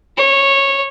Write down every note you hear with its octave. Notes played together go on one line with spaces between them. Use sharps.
C#5